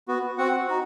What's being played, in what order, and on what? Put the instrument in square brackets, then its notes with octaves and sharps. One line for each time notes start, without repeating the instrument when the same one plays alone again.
[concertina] B3 F#4
C4 F#4 F#5
D#4 F#4